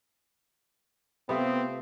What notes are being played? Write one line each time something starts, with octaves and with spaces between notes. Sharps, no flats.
C3 A3 B3 C4 F4